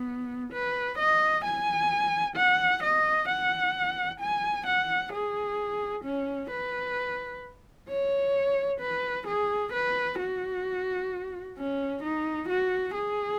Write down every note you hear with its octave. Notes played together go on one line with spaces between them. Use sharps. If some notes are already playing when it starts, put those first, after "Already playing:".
Already playing: B3
B4
D#5
G#5
F#5
D#5
F#5
G#5
F#5
G#4
C#4
B4
C#5
B4
G#4
B4
F#4
C#4
D#4
F#4
G#4